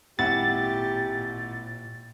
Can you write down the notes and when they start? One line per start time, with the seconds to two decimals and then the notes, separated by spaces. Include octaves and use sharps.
0.19 G#1 A#2 E4 G4 F#5 A6